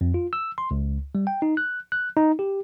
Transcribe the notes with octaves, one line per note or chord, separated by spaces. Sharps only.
F2
F4
E6
C6
C#2
G3
G5
D#4
F#6
F#6
D#4
G4